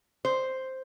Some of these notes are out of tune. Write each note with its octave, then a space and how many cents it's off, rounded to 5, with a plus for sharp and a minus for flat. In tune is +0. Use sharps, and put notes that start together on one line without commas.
C5 +0